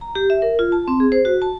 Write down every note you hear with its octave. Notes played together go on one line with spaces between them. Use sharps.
A#5
G4
E5
A#4
F4
A5
C4
G#4
C5
F#4
A5